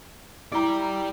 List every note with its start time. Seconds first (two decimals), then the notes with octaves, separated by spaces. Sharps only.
0.52 E4 G4 D5 A#5